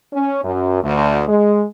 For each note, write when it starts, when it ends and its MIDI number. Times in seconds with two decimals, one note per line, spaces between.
0.13 0.43 61
0.44 0.82 42
0.83 1.23 38
1.27 1.64 56